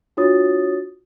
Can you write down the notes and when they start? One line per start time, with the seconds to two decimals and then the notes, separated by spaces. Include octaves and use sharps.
0.17 D4 F4 F#4 C#5 D#6 A6